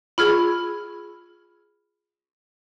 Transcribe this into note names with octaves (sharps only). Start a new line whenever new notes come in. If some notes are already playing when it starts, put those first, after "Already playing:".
F4 G#4 B5 F6 G#6